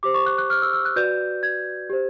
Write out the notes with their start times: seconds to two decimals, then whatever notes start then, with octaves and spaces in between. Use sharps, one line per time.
0.03 G4 C5 D6
0.14 C#6
0.26 F#6
0.38 F#6
0.50 F6
0.62 E6
0.73 E6
0.85 F#6
0.96 F#4 B4 D5 G6
1.43 G#6
1.90 G4 C5